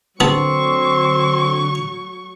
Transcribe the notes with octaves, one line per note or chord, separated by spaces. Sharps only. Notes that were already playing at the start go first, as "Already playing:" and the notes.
D3 F#3 B3 C4 G#4 A5 C#6